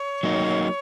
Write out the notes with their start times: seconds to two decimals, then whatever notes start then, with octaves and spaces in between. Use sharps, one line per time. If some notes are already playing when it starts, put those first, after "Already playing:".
Already playing: C#5
0.23 F#3 A#3 D#4